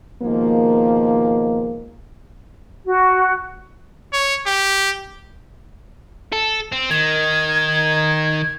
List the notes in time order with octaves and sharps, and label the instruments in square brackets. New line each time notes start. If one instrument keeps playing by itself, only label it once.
[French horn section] B2 D#3 F3 G#3 A#3
[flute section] F#4
[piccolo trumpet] C#5
G4
[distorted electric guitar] A4
C4
[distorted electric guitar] D#3 [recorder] G#6